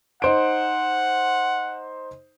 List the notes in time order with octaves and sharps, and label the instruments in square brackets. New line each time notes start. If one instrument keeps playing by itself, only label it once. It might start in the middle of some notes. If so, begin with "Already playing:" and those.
[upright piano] D#4 C5 D7 [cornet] F#5